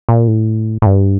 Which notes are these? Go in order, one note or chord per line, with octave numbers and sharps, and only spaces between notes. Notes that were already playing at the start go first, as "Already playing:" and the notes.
A#2
A2
A2
G2